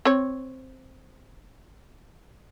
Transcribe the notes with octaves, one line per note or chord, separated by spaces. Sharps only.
C4 C#5